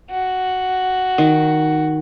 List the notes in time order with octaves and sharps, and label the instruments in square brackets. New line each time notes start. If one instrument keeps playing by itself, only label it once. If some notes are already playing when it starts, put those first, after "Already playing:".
[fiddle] F#4
[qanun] D#3